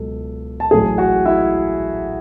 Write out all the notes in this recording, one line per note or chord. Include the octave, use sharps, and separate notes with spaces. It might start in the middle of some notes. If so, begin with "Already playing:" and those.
Already playing: C#2 B2 F#3 A4
A5
A1 A2 F#3 G#4 G#5
F#4 F#5
E4 E5